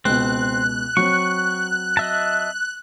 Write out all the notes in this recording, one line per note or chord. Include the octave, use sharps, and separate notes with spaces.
C#2 B2 C4 F#6
F#3 C4 C#6
D#5 E5 A5